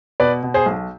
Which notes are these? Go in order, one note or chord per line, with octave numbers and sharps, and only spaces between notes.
B2 B4 D5
B2
G#4 C5
B1